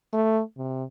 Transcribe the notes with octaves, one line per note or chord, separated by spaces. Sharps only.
A3
C3